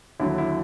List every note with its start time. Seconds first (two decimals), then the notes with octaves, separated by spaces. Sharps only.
0.19 D#2 D3 F#3 E4
0.38 E4